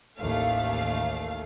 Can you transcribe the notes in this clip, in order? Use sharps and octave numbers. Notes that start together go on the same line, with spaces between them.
A1 D#2 A3 F5